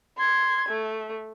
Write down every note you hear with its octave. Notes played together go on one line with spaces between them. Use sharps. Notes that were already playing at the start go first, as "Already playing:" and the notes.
C6 G#6
A3